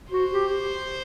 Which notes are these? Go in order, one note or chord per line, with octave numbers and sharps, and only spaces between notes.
F#4 C5
G4